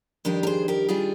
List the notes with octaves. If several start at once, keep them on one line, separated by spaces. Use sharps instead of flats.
F2 D#3 G3 D4 G4 A#4
A#4
G#4 C5
G4 A#4
D#3 G3 D4 F4 G#4